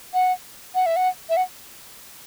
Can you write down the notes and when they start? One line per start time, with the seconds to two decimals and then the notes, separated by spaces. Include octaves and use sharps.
0.14 F#5
0.75 F#5
0.86 E5
0.96 F#5
1.29 E5
1.37 F#5